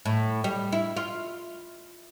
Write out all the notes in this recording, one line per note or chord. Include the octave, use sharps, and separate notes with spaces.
A2
G3
E4
F4